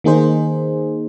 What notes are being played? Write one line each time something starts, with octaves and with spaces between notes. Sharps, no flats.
D#3 A#3 D#4 G#4 C5